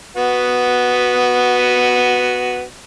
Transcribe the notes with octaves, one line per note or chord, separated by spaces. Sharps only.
B3 F#4